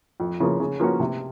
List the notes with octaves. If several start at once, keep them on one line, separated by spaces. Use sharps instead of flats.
F2
C#3 F3 A#3
C#3
F3 A#3 C#4 F#4
C3